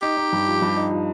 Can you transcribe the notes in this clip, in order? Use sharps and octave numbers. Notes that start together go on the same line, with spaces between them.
D#4 G4
D#4
G2
F3
G2
D#4
F3